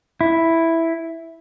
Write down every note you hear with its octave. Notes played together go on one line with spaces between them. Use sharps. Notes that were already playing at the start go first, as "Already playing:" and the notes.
E4